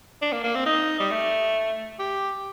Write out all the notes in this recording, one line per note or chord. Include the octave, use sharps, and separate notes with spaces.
D4
A#3
A#3
C4
D#4
G3
A3
G4